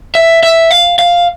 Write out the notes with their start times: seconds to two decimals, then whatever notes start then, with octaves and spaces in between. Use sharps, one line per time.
0.15 E5
0.43 E5
0.71 F5
0.99 F5